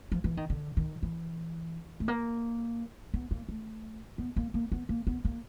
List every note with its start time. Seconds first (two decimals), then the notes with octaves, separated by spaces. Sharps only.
0.12 F3
0.24 E3
0.37 D#3
0.50 D3
0.77 D#3
1.03 E3
2.00 A3
2.08 A#3
3.14 B3
3.31 A#3
3.49 A3
4.18 B3
4.36 A#3
4.54 A#3
4.72 B3
4.89 A#3
5.07 B3
5.25 A#3